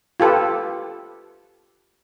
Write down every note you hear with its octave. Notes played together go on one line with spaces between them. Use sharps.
F4 G4 A4 B4